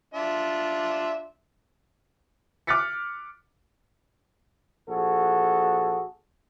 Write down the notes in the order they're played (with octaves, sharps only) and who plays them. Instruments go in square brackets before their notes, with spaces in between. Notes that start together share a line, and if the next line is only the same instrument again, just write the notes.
[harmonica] D4 F4 E5
[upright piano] D6 F6 F#6 A6 B6 C#7
[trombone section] A#1 F#4 G#4 A4